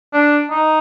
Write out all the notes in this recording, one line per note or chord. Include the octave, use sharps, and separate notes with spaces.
D4
D#4